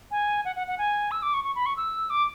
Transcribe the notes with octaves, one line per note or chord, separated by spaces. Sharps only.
G#5
F#5
F#5
F#5
G#5
E6
D6
C#6
C#6
B5
C#6
E6
D6